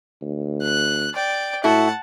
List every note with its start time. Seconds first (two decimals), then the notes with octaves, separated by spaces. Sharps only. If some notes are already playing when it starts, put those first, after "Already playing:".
0.22 D2
0.62 F#6
1.15 D5 G5
1.64 A2 E4 F#4 A4 F#5 A5